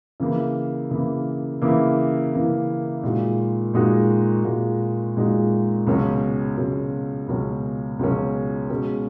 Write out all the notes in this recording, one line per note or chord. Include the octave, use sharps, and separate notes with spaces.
C#3 E3 A#3 E4
C#3 E3 A#3 E4
C#3 E3 A#3 E4
C#3 E3 A#3 E4
A#2 G#3 D#4 F#4
A#2 G#3 D#4 F#4
A#2 G#3 D#4 F#4
A#2 G#3 D#4 F#4
C#2 B2 F#3 C#4
C#2 B2 F#3 C#4
C#2 B2 F#3 C#4
C#2 B2 F#3 C#4
B2 G#3 C#4 G#4